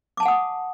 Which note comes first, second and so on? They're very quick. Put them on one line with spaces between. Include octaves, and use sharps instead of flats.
D6 A5 G#5 F#5 D#6